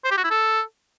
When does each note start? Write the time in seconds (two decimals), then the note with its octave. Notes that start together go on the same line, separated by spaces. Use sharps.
0.04 C5
0.11 G4
0.17 F#4
0.24 E4
0.31 A4